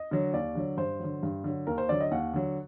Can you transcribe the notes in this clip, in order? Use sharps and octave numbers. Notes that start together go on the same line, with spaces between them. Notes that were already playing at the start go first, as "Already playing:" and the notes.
Already playing: D#5
D3 F#3
D#2 D5
D3 F#3
G2 C5
D3 F#3
G2
D3 F#3
D#2 A#4
C5
D3 F#3 D5
D#5
D#2 F#5
D3 F#3